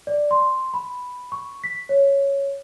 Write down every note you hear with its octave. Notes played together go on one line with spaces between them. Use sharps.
D5
C6
B5
C#6
B6
C#5